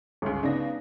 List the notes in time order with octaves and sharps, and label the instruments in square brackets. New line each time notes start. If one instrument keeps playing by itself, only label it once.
[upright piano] G1 C#2
[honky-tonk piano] C#3 D4 A#6 [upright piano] B3 D#4